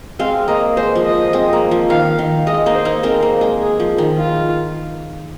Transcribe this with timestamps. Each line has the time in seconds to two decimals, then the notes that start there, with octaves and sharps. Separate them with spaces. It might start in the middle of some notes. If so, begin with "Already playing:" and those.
0.19 G#3 C4 F5
0.48 A#3 D#5
0.76 G#3 C5
0.95 F3
1.05 D#5
1.33 G#3 C4
1.53 A#3
1.71 F3
1.90 D#3 F5
2.19 D#3
2.47 G#3 D#5
2.66 A#3 D#4
2.75 C5
2.85 A#3 D#4
3.03 G#3 C4 A#4
3.22 A#3
3.41 G#3
3.60 G#4
3.80 F3
3.98 D#3
4.17 F4